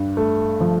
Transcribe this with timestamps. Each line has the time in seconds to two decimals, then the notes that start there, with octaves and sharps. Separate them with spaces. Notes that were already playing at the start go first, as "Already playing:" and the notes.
Already playing: G2
0.17 A3
0.61 F3